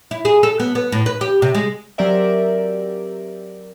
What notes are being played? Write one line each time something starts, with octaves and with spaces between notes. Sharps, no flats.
E4
G#4
A4
B3
B3
A2
B4
G4
C3
G#3
F#3 C4 G4 A#4 D5 E5